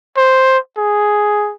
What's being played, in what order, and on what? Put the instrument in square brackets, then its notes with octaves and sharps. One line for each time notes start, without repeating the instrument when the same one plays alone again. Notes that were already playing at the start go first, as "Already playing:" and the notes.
[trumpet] C5
G#4